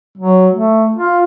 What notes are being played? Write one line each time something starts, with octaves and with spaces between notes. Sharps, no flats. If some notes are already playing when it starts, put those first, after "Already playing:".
F#3
A3
F4